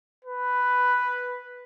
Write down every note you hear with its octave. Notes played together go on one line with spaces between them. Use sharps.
B4